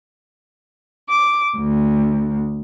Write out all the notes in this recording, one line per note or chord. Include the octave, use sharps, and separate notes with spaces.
D6
D2